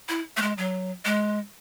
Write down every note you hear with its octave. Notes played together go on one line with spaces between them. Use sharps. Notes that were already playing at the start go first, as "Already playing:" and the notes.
E4
A3
G#3
F#3
G#3